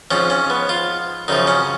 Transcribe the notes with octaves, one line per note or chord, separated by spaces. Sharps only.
G#2 F3 C#4
C#4
B3
F4
F#2 C#3 F3 D#4
C#4